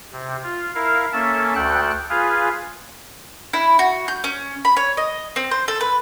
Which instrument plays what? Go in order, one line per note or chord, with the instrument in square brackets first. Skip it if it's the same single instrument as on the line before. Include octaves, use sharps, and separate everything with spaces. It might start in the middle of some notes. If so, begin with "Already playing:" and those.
[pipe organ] C3
F4
E4 A#4 F5
A#3 C#4 A4 E5 A5
D2 A4 G5 F#6
F4 G#4 B4 F5
[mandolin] E4
F#4
G6
C#4
B5
C#5
D#5
C4
C5
A4
B4